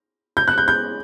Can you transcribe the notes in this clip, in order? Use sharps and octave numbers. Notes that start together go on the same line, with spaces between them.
G6
F#6
G6
G6